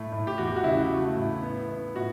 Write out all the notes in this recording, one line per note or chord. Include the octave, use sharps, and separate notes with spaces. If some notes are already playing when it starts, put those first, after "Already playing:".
Already playing: A2 A3
A2
G4
E2 F#4
G4
F#4
C#3 E4
A3
A2
B3
B3
A2 F#4